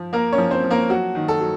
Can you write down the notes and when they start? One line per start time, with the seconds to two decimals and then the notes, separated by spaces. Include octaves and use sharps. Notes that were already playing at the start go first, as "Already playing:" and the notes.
Already playing: F3
0.13 A#3 A#4
0.33 C#4 C#5
0.38 F3
0.51 C4 C5
0.64 F3
0.70 A#3 A#4
0.90 F#3 F#4
1.15 D#3
1.28 A4
1.40 F#3